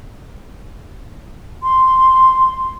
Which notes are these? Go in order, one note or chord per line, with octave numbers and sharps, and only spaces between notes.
C6